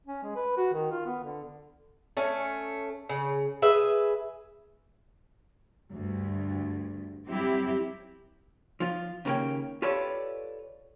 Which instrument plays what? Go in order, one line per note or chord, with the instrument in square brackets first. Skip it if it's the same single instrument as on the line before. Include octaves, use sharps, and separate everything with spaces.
[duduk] C#4
G#3
B4
F#4
D#3
F4
B3
D3
[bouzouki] A3 C#4
C#3
G#4 B4 E5
[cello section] D2 G2
F#3 G3 C4 E4 G4
[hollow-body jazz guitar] F3 F4
D#2 C#3 F3 A#3 C#4 G5
F4 G4 A4 B4 C#5 D5